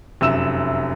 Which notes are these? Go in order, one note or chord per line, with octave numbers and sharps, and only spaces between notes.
F1 F#2 E5 E6 E7